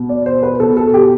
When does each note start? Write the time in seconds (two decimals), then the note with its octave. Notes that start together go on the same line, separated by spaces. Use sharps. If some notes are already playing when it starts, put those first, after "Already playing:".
Already playing: B2
0.09 D5
0.26 C5
0.43 B4
0.60 B2 A4
0.77 A4
0.94 G4